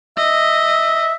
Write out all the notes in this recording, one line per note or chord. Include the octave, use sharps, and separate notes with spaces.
D#5 E5